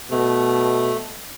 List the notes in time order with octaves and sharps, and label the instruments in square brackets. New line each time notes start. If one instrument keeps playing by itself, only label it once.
[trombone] B2 [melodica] A3